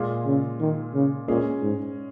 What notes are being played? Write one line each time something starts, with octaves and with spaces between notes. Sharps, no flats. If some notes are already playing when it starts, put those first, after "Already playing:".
Already playing: A#2 G#3 F4 G#4
C#3
D#3
C#3
A#2 G#3 C#4 G#4
G#2